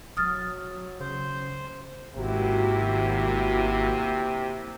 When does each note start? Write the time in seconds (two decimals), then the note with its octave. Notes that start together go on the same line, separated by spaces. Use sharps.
0.17 E1 F#3 D#6 F6 A6
1.00 C#3 C5
2.15 G#1 C3 A#3 E4 F#4